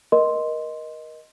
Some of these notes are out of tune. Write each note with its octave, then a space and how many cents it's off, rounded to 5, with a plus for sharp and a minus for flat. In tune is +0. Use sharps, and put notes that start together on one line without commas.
A#4 +30 D#5 +0 C6 +0